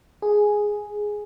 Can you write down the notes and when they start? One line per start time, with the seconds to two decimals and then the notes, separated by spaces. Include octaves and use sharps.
0.22 G#4